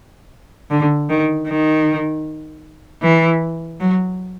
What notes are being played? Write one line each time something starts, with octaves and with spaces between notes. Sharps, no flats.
D3
D#3
D#3
E3
F#3